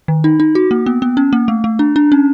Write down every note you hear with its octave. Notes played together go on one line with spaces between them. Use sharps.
D#3
D#4
D#4
F#4
A#3
B3
B3
C#4
A#3
A3
A3
D4
D4
C#4